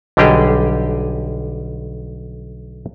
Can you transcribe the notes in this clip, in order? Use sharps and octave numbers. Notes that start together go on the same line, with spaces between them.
B1 D3 G3 G4 G#4 D#5